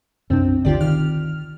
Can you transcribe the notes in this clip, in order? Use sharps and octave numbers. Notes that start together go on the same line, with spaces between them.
B1 F#2 C3 C4 D4
G1 D2 D3 F4 G4 D5
D#3 F6